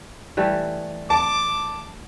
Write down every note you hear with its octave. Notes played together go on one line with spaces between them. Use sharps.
E3 G3 A3
A5 D6